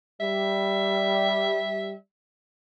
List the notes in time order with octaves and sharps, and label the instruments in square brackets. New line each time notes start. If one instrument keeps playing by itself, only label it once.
[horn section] G3 [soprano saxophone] E5